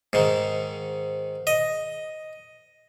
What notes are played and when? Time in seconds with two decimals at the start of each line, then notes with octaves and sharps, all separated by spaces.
0.13 G#2 D#3
1.47 D#5